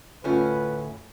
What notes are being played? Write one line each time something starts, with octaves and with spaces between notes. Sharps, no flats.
D2 A2 C#4 F4 B4